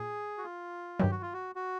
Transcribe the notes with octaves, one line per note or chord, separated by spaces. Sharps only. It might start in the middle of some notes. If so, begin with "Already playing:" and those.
Already playing: A#2 G#4
F#4
F4
G2 D#3 F#3 G4
F#4
F4
F#4
F#4